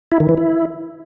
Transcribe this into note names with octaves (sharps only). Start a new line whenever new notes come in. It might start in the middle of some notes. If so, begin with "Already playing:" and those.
E4
D#3
E3
E4